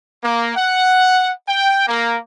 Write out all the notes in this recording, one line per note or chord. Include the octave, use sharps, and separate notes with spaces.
A#3
F#5
G5
A#3